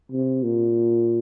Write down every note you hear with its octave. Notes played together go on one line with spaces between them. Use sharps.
C3
A#2